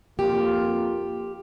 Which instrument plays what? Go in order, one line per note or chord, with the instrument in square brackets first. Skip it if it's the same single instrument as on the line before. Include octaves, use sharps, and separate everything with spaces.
[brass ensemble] F2 A#3 F4 [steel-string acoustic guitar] G4